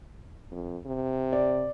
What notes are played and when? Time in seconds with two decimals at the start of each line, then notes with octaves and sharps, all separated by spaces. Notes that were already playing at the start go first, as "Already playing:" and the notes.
0.51 F2
0.86 C3
1.33 D5